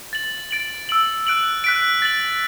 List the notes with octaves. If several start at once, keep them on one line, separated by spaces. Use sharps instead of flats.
A6 F#7
A6 D7 F#7
E6 D7 F#7
F#6 D7 F#7
F#6 B6 D7
A6 F#7